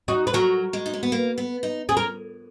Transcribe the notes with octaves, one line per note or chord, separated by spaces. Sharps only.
D#4 F#4
B4
F#3 F#4 A#4
G#3
D#4
C#4
B3
A#3
B3
D#4
C#4 G#4
A#4